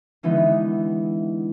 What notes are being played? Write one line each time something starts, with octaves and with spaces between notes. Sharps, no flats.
D3 E3 G#3 B3 D#4